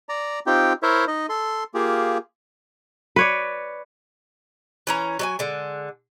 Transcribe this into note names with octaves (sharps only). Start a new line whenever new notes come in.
D5 A#5
C4 D#4 F4 G4 G5
E4 A#4 C5 C#5 E5
D#4 D#5
A4 C6
A#3 F4 G4 G#4
B4 C#5 D5
E3 C#4 A#5
F#3 D5 G#5
D3 G#3